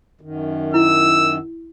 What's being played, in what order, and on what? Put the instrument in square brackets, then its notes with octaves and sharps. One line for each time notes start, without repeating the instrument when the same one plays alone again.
[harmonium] F#2 D#3
[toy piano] E4 [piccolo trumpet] E6